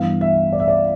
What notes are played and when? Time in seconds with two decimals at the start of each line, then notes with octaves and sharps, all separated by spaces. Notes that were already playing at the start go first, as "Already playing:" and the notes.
Already playing: G2 E3 B3 F5
0.21 E5
0.52 D5
0.60 E5
0.68 D5